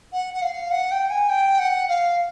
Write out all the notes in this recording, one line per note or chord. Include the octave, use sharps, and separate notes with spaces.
F#5
F#5
F5
F#5
G5
G#5
G5
F#5
F5